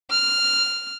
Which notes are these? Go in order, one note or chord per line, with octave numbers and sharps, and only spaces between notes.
F6